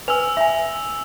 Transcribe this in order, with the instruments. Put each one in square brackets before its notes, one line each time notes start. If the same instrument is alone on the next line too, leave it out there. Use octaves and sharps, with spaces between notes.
[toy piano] B4 G#5 [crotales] E6 F7
[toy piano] E5 G#5